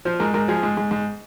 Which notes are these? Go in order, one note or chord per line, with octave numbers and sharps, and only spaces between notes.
F3 C5
G#2 A#4
G#2 A#4
F3 G#4
G#2
G#2
G#2